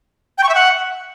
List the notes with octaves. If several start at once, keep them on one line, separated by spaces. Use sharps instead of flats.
G5
C#6
E5
F#5